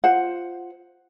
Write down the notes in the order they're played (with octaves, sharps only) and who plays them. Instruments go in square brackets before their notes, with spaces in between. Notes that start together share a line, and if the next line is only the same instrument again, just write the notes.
[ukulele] F4 C5 F#5